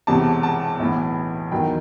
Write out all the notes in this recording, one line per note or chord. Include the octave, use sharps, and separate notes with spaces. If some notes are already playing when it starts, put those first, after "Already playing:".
E1 E2 C3 A5
A5
B1 A2 E3
E2 D#3 F#3 G5